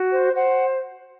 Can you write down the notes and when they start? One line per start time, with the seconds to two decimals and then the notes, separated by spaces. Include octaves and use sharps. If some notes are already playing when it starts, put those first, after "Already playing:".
Already playing: F#4
0.11 C5
0.35 C5 F#5